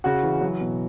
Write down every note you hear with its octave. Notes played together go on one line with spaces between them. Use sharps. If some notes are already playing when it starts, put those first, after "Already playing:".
C#3 F#4
E3
F#3
B2